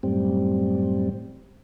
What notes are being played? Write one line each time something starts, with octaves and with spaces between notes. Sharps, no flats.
F#2 A2 G3 C4